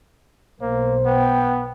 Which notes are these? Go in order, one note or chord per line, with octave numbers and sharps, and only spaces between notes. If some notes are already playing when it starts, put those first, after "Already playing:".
B1 A#3 C5
B3 G5